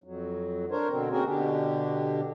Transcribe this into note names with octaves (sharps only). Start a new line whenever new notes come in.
F2 F#3
D4 A#4 C5 C#5
B2 D3 C4
A#3 C4 C#4 F#4 G#4 A#4
B2 D3 D4 G4